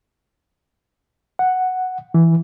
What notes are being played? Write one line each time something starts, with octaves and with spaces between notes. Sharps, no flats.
F#5
E3